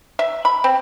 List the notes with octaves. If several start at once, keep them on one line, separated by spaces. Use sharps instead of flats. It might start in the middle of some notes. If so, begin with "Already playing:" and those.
E5
B5
C4